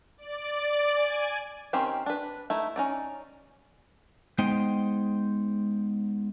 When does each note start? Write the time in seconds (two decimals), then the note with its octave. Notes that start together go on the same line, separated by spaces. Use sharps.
0.18 D5
0.95 G#5
1.73 D#3 C4 C#4 G4 C5
2.06 D4 B4
2.50 A3 D#4 E4
2.76 C#4 D#4 D5
4.39 G#3 B3 D#4 C5 G5